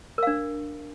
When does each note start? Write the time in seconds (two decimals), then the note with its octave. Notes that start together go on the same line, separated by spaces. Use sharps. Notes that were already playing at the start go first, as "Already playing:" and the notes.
0.18 A#4
0.23 F5
0.27 D4